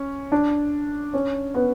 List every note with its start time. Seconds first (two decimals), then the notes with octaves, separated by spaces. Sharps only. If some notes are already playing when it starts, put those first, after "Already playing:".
Already playing: C#4
0.32 D4
1.14 C#4
1.54 B3